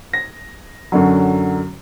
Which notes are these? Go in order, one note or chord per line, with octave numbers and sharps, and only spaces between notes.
A#6
F#2 D3 F#3